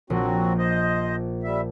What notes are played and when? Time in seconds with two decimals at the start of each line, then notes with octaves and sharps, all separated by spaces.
0.10 A#1 F#3 C4 F#4
0.58 C5 D#5
1.43 G3 E5